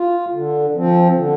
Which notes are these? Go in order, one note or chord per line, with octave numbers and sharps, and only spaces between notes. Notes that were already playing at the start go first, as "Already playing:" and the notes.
Already playing: F4
D3
F3 C4
D3